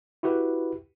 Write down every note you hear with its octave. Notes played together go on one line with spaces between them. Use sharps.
E4 F#4 G4 B4